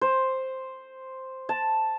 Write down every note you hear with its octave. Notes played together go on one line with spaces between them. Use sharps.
C5
A5